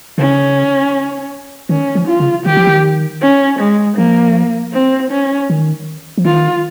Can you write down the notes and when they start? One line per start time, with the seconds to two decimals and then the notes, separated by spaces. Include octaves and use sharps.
0.18 C#3 C#4
1.69 D#3 C#4
1.95 F3
2.08 F4
2.20 C#3
2.46 D#3 G4
2.57 F3
2.67 D#3
3.22 C#4
3.60 G#3
3.97 F3 A#3
4.73 C4
5.11 C#4
5.50 D#3
6.18 F3
6.25 D#3 F4